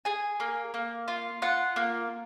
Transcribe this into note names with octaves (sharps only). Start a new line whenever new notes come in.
G#4 G#5
A#3
A#3
F4
F4 F#5
A#3